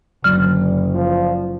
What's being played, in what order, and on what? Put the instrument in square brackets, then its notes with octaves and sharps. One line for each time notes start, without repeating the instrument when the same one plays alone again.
[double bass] F#1 [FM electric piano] D3 F#3 D5 [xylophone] F6
[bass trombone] F3